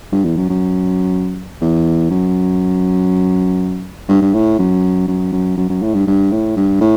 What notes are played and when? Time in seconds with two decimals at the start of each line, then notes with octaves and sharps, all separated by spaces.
0.12 G2
0.25 E2
0.37 F#2
0.49 F#2
1.61 E2
2.10 F#2
4.09 G2
4.22 G2
4.34 A2
4.58 F#2
5.08 F#2
5.32 F#2
5.57 F#2
5.70 F#2
5.82 A2
5.94 G2
6.07 G2
6.32 A2
6.57 G2
6.81 A2